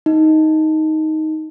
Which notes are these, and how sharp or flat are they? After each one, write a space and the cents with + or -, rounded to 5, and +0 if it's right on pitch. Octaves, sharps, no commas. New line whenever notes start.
D#4 +10